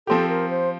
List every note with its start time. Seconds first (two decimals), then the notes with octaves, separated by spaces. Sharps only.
0.07 F3 C4 G4 A4
0.29 A#4
0.50 C5